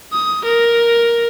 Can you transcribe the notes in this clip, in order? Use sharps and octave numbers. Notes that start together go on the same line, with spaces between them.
D#6
A#4